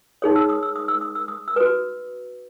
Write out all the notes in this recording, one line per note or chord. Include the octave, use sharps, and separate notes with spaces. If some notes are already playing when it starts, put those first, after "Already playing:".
D#4 G#4 C#5 D#6
E6
D#6
E6
D#6
E6
D#6
E6
D#6
E6
F#4 B4 D#6